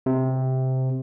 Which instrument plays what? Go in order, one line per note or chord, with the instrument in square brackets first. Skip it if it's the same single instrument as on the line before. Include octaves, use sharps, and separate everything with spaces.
[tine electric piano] C3